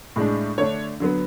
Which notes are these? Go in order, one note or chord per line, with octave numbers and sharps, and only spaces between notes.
A2 G#3 D4
D3 A3 D4 C#5
D3 F#3 B3